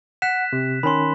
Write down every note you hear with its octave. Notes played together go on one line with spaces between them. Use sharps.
F#5 F#6 B6 E7
C3
D#3 C#4 B5 C6